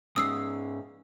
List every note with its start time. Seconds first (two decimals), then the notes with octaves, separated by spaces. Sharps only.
0.16 G#2 G#3 C#4 D#6 E6 C7